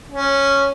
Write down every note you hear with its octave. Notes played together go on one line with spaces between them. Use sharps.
C#4